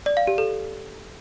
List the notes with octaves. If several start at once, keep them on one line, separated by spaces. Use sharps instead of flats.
D5
F5
G4
A4